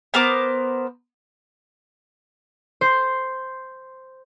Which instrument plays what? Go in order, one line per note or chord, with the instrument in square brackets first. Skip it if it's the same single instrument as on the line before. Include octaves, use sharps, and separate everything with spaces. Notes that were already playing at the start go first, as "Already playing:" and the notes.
[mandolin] B3 A#4 C5 D6
[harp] C5